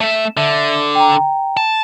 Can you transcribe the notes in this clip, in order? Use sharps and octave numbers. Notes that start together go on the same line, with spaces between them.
A3 E5
D3 E5
G5 A#5
A5